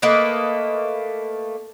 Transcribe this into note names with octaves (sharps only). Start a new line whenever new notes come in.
A3 A#3 B4 D#5